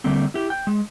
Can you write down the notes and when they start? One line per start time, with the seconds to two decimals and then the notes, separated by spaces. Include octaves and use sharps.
0.04 D3 G3 A3 A#3 C4
0.34 E4 G4
0.50 G5
0.67 G#3